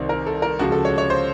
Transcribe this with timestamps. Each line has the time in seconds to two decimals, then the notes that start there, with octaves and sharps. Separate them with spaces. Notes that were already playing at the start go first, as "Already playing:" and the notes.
Already playing: C2 C3 D#3 C5
0.09 A#4
0.26 A4
0.42 A#4
0.59 C#2 C#3 F3 F#4
0.72 A4
0.85 C#5
0.98 C#5
1.10 C5